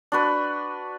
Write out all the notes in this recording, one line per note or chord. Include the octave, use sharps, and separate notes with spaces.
D4 F#4 B4